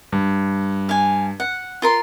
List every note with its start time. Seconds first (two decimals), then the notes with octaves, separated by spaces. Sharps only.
0.12 G2
0.89 F5 G#5
1.40 F#5
1.82 F4 A#4 C6